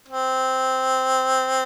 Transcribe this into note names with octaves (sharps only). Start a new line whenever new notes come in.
C4